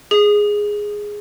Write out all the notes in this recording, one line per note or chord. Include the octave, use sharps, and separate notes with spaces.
G#4